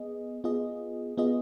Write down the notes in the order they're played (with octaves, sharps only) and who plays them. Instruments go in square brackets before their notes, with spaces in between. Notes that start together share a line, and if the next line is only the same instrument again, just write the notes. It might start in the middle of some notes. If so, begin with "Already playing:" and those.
Already playing: [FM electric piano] B3 G#4 D#5
B3 F4 G#4 D#5
B3 F4 G#4 D#5